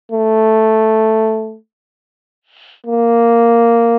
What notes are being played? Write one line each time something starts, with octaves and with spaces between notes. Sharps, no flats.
A3
A#3